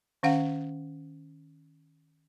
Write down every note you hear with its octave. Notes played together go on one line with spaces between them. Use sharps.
D#3 C#4 F5 F#5